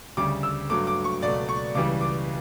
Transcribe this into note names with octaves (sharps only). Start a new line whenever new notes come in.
D2 C#3 G3 D6
E6
G2 F#3 A3 D6
D6
C#6
C#2 B2 F#3 A3 D5
C#6
C#2 C#3 E3 G3 D6
D6